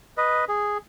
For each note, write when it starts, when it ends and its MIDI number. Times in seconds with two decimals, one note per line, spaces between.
0.17 0.45 71
0.17 0.45 75
0.49 0.78 68